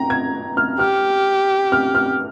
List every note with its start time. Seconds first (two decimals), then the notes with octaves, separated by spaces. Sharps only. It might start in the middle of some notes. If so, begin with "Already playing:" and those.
Already playing: G5 A#5
0.10 G#6
0.57 F6
0.79 G4 F6
1.72 F6
1.95 F6